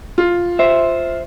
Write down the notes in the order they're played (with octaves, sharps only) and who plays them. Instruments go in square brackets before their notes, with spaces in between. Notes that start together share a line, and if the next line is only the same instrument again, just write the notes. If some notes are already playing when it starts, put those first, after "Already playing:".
[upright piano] F4
[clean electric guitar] C5 E5